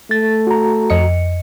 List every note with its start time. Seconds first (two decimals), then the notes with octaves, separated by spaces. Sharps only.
0.11 A3 A6
0.47 F#4 A#5
0.90 F2 D#5 C#7